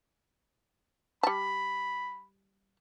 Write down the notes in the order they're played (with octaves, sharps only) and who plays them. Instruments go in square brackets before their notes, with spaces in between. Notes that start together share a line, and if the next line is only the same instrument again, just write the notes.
[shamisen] G3 A5 [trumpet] B5